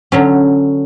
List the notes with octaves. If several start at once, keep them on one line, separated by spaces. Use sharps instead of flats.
D3 F#3 C#4